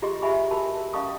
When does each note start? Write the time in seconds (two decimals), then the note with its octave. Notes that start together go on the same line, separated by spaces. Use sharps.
0.02 F4 G4 G#4 D#5 C6 C#6
0.22 G4 E5 G#5 B5 C#6
0.51 F#4 A#4 G#5 A5 B5
0.77 A#4
0.93 C#4 D#5 F5 A5 C#6 D#6